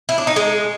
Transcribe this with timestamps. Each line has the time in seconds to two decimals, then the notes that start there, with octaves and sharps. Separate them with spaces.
0.09 E4
0.18 D4
0.27 D#4
0.36 G#3